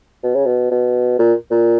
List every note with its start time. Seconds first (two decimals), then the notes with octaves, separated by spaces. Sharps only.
0.23 B2
0.35 C#3
0.46 B2
0.71 B2
1.19 A#2
1.51 A#2